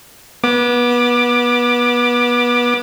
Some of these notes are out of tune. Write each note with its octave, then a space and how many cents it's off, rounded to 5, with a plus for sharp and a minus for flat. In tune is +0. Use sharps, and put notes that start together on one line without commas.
B3 -25 D6 +15